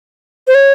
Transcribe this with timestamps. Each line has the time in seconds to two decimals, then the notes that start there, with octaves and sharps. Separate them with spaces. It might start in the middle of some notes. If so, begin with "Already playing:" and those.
0.47 C5
0.55 C#5